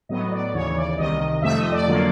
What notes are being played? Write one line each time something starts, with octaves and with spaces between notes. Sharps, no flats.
A2 F#3 B3 D#5
D5
D#2 C#3 E3 C#5
D5
C2 C3 D#3 D#5
F2 C3 F3 A3 E5
D#5
D5
F2 D3 F#3 A#3